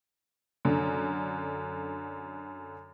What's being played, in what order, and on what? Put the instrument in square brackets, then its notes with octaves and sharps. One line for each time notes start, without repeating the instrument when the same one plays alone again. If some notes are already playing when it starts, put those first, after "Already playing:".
[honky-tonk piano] F#2 D3